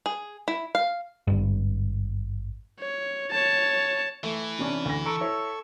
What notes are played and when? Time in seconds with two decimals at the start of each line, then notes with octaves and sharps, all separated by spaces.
0.06 G#4
0.48 E4
0.75 F5
1.27 G#1 G2
2.79 C#5
3.30 C#5 A5
4.23 E3 A3
4.59 C3 C#4 D4
4.85 D2 A#6
5.06 A4 A#5 C#6 E6 C#7 D7
5.21 E4 C#5 E5